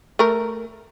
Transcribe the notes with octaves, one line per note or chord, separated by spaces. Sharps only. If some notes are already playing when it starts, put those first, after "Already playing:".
A3 A#4